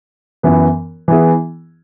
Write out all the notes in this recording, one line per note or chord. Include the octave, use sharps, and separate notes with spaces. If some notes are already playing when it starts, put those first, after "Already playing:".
F#2 E3 B3
E3 B3 E4 G#4